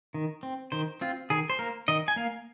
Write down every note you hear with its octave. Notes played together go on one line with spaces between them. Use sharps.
D#3
C4
D#3 C5
C4 F4
D#3 G#4
C5
A#3 A#4
D#3 D#5
G#5
A#3 F5